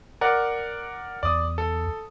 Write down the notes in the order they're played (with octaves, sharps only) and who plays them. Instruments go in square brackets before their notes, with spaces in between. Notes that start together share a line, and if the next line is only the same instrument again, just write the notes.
[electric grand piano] A#4 D5 F#5
[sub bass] E2 [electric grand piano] D5 D#6
[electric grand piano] A4